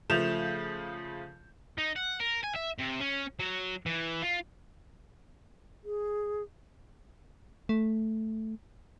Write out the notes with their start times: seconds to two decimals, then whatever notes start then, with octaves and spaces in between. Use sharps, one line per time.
0.10 C#3 F3 A3 G6 E7 F7
1.78 D#4
1.96 F#5
2.20 A#4
2.44 G#5
2.56 E5
2.80 C3
3.01 C#4
3.40 F#3
3.86 E3
4.22 F4
5.84 G#4
7.69 A3